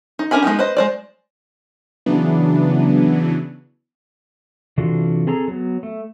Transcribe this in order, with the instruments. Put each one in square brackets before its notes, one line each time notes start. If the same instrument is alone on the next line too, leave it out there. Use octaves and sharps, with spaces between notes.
[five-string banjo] D#4
C#4 D4 A#4 G#5 B5
G#3 B3 C#4 D#4 G4
B4 C5 D#5
G#3 C5 D5
[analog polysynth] C#3 E3 F#3 B3 D4
[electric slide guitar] C3 E3 D4 F4 F#4 A4
C4 G#4 A4 A#5
F#3 B3
A3